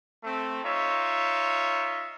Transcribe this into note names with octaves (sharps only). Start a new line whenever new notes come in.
A3 C4
D#4 F4 C#5 E5